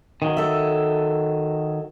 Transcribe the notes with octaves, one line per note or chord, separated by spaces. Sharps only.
D#3 F#3
A4 E5